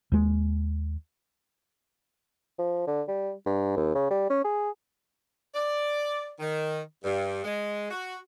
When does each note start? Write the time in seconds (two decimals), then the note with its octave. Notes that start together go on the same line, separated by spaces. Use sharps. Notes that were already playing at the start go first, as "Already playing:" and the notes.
0.12 D#2 G#3
2.59 F3
2.87 D3
3.08 G3
3.46 G2
3.77 D#2
3.95 C#3
4.11 G3
4.30 C#4
4.44 G#4
5.55 D5
6.40 D#3
7.03 G2
7.45 G#3
7.90 F#4